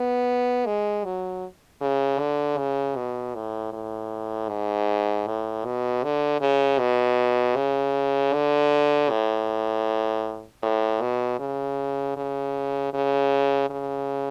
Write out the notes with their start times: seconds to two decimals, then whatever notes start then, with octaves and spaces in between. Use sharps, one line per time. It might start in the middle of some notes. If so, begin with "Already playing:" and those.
Already playing: B3
0.66 G#3
1.04 F#3
1.81 C#3
2.19 D3
2.58 C#3
2.96 B2
3.35 A2
3.73 A2
4.49 G#2
5.27 A2
5.65 B2
6.03 D3
6.41 C#3
6.79 B2
7.56 C#3
8.34 D3
9.10 A2
10.63 A2
11.01 B2
11.39 C#3
12.16 C#3
12.93 C#3
13.70 C#3